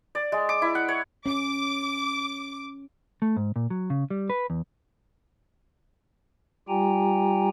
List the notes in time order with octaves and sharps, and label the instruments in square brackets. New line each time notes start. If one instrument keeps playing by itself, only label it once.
[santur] D5
G#3
D6
E4
F#5
C#5
[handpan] C#4 [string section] D6
[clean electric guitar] A3
G#2
A#2
F#3
C#3
G3
B4
E2
[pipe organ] G3 F4 G4 G5 G#5 A#5